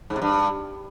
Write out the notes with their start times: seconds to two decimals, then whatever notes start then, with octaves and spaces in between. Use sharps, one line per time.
0.10 G#2
0.16 C3
0.22 G2